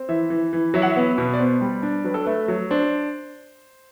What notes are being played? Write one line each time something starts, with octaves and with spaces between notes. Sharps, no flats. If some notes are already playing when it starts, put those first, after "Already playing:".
Already playing: C4
E3 E5
E3
E3
F#3 E5
F#5
E5
B3
B2
D5
B3 C5
G3
D4
F#3 B4
A4
A3 B4
F#3
D4 C5